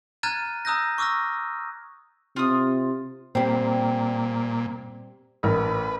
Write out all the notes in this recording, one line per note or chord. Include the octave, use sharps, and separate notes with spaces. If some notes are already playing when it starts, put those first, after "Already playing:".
A#5 F6 F#6 G#6 A6 D#7
A#5 D#6 E6 F#6 G6 A#6
C#6 D6 E6 F6 A#6
C3 F4 D#6
A#2 G3 C4
A1 A#4 B4